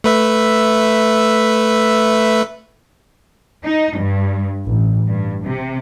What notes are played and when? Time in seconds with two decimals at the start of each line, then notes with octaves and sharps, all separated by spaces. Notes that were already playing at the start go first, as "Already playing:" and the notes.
0.04 A3 B4 E5
3.64 D#4
3.97 G2
4.66 A1
5.08 G2
5.44 C3